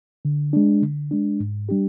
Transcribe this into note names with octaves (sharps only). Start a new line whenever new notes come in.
D3
G#3 D4
D3
G#3 D4
G#2
G3 D4 G4